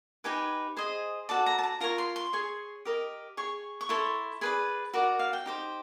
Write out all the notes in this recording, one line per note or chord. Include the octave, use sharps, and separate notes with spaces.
D#4 G4 B4 G#5
G#4 C5 D#5
F#4 A4 D5 A5
A#5
A5
A#5
F4 A#4 C#5 A#5
C6
C6
G#4 C#5
G4 A#4 D#5
G#4 C#5 C#6
C#6
E4 A4 C#5 C6
G#4 B4 D5 B5
F#4 A#4 D5
F5
G5
D#4 G4 C5